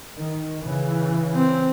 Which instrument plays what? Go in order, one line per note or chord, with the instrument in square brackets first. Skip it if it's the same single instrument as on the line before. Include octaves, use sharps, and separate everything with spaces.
[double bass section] D#3
C#3 E3
[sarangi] C4